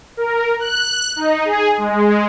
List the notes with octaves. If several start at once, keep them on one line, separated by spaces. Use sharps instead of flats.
A#4
F#6
D#4
G#4
G#3